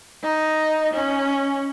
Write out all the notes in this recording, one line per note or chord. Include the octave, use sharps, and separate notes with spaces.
D#4
C#4